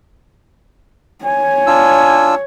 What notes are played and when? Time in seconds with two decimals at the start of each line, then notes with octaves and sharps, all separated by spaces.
1.25 C#5 G#5
1.67 D4 F4 E6